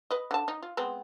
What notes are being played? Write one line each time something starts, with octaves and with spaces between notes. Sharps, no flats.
B4 D#5
D3 A5
D#4
F4
G#3 B3 C4